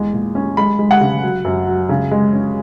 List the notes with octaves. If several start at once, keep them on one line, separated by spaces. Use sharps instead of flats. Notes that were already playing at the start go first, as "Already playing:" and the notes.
Already playing: E2 G#3
A#2
C#4
G#3 B5
G#3
F#5
C#3
F#3
F#2
F#3
C#3
G#3
C#4